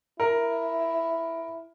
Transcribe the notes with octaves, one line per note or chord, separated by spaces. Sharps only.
E4 A#4